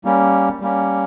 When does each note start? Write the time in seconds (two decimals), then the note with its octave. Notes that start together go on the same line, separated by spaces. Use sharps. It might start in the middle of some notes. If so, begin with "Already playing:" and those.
0.04 G3 A#3 C#4
0.60 G3 A#3 C#4